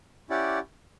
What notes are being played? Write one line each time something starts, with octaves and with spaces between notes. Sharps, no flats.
C#4 E4 G4 D5 F#5